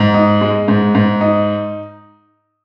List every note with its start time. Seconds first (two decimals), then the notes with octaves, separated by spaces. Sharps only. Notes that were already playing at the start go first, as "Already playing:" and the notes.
Already playing: G#2
0.14 D#4
0.41 G#3
0.68 G#2
0.95 G#2
1.21 D#4